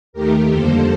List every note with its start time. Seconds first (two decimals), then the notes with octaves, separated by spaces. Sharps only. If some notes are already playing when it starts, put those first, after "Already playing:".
0.13 D#2 D#3 A3 G4 A#4
0.50 F2 D3 G3 A#3 A4 C5